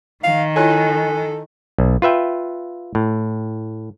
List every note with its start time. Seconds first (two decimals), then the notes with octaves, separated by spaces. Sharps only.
0.23 D#3 F5
0.56 E4 F4 A4 C#5 G#5 F#6
1.78 B1
2.02 F4 B4 E5 G5
2.95 A2